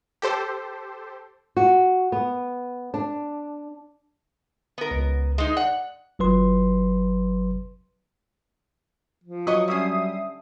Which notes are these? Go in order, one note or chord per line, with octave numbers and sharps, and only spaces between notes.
G4 A4 C5
F#4
B3
D4
B3 A#4
C#2
G#3 D#4
D5 F#5
G1 F#3 B4 C6
F3
F#3 B4 C#5 D#5 C#6 D#6
D3 G3 C#4 E5 D#6 C7